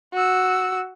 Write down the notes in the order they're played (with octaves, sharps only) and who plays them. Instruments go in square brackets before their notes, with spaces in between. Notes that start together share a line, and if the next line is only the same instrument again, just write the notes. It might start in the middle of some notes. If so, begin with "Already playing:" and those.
[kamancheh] F#4 E6